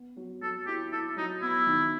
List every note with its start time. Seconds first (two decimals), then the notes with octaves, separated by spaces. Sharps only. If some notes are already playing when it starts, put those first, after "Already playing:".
Already playing: B3
0.17 F#3
0.42 F#3 A4
0.67 E4 G4
0.92 E4 A4
1.17 F#3 D#4
1.42 B3 E4
1.67 D#3